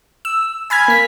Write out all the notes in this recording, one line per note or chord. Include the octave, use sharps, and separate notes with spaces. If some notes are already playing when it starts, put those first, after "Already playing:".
E6
G#5 B5 F6 G#6
A#3 B6